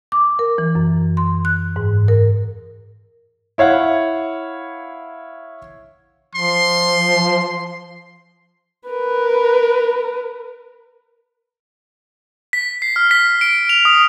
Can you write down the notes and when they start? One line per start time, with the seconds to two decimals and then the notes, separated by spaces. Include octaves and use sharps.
0.12 D6
0.39 A#4
0.58 E3
0.75 F#2
1.17 C6
1.45 F#6
1.76 G#2
2.08 A#4
3.58 E4 C#5 F5 F#5
6.35 F3 C6
8.88 A#4 B4
12.53 B6
12.82 C7
12.96 F6
13.11 B6
13.41 D7
13.69 F7
13.85 D#6